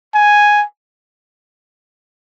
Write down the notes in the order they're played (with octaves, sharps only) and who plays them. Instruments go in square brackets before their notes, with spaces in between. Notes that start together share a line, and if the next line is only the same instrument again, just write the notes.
[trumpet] G#5